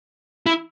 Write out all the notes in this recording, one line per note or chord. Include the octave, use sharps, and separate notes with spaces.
E4